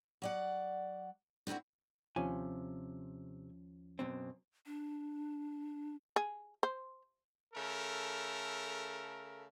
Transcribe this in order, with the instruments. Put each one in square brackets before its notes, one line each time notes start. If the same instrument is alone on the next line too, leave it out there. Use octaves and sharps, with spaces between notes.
[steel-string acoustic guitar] F#3 D5 F#5
D3 C4 D#4 E4 F#4
[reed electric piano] D#2 F3 C#4 [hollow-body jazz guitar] C3 G#5
[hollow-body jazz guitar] F#2 B2 C4
[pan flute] D4
[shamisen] G#4
C5
[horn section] C#3 A3 A4 A#4